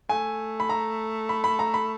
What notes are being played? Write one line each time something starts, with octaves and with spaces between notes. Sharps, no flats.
A3 G#5
B5
A#5
B5
B5
A#5
B5